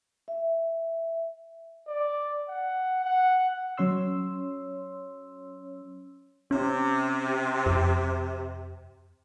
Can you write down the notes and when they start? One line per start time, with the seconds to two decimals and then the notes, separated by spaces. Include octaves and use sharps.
0.28 E5
1.88 D5
2.49 F#5
3.05 F#5
3.78 F#3 C#4 C#5 C6 E6
6.51 C3 C#4
7.66 F2